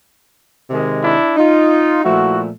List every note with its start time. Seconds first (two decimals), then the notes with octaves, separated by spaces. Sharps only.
0.70 C3 D#3 G#3
1.03 D4 E4
1.37 D#4 F4
2.04 A#2 F3 A3 E4 F#4